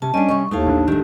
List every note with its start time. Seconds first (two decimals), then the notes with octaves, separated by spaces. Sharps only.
0.02 C3 C#4 A5
0.14 G3 C#4 D4 D#5
0.29 C3 G3 D#5 C#6
0.51 D#2 A3 D#4 E4 F5 A5
0.65 A1 D4
0.88 D#3 A3 G4